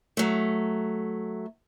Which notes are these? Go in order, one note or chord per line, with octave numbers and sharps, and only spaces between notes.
F#3 A3